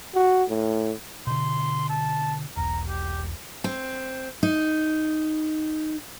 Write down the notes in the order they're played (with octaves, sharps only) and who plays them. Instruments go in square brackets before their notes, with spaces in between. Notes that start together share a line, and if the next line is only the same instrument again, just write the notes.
[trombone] F#4
A2
[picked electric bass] B2 D3 [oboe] C6
[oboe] A5
[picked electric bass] E1 B1 [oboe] A#5
[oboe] G4
[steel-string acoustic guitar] C4
D#4